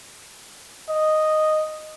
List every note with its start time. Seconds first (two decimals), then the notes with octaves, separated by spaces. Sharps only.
0.89 D#5